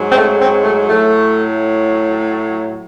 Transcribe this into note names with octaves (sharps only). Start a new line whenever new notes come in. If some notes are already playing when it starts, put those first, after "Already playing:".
Already playing: G#2 F#3
C4
A3
C4
A3
A2 F#3 A3